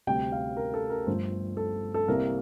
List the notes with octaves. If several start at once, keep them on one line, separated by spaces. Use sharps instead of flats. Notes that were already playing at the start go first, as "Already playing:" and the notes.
D2 C3 G3 G5
F5
A#4
A4
A#4
G1 G2 F3 A3 C5
A4
A4
C2 C3 G3 A#3 A#4